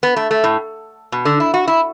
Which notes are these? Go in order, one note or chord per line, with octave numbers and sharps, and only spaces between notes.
B3
A3
A3
A2
B2
D3
E4
F#4
E4